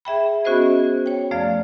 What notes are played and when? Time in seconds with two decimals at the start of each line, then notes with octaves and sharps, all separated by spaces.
0.05 G#4 E5 G5 B5
0.45 B3 C#4 F#4 G#4 C5 D#5
1.06 C#5 G5
1.31 F#2 F3 A3 D5 F5 F6